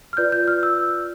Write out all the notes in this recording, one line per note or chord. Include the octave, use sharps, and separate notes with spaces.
F6
F4 B4 D5 G6
G6
F6
E6